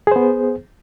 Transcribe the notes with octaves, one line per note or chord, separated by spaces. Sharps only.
B3 G#4 C5